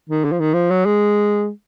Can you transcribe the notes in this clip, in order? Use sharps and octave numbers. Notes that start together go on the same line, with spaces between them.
D#3
D3
F3
D#3
F3
F#3
G#3